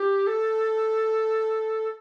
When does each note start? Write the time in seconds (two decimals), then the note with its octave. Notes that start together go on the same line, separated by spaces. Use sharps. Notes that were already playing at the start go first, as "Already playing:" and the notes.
Already playing: G4
0.27 A4